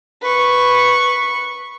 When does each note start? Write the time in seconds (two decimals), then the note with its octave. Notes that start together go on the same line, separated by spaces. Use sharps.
0.22 B4 C#6